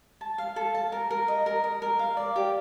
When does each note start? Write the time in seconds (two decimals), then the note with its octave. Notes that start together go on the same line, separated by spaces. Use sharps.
0.21 A5
0.38 F5
0.56 A4
0.75 A5
0.92 A#4
1.11 A#4
1.28 D#5
1.46 A#4
1.64 A#4
1.82 A#4
1.99 F5
2.17 D5
2.36 G4